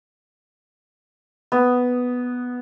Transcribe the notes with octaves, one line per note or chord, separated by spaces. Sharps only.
B3